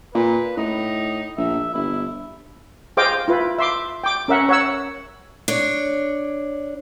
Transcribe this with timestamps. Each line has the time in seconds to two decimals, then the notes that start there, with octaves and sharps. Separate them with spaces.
0.15 A#2 B4
0.57 A2 D#4
1.38 A#1 E5
1.74 G1 E4
2.97 G#4 C5 D#5 F5 G5 D6
3.28 E4 F4 B4
3.58 E5 C6 D6
4.04 G5 D6
4.28 C#4 A#4 E5 F#5
4.49 C#5 F#5 E6
5.48 D4 C#5